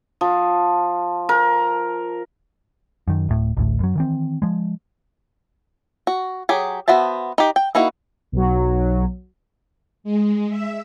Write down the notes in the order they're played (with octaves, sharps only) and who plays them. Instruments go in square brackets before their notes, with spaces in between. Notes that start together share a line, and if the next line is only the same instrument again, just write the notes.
[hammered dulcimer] F3
A#4
[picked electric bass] F#2 D#3
D1 A2
A1 D2 A2
F#2 F#3
D#3 E3 C4
F3 G#3
[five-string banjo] F#4
F#3 G4 G#4
B3 F#4 C5 E5 A5
D#4 G4
G5
A#3 D#4 E4 F#4
[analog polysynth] B1 F#3
[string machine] G#3
E5